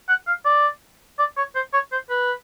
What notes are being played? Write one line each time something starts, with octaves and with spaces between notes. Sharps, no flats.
F#5
F5
D5
D5
C#5
C5
C#5
C5
B4